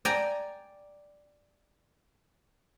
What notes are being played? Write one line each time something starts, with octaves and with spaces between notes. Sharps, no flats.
D5 G5 G#5 A#5